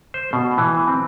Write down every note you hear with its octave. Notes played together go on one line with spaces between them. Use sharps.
C5
B2
E3
C4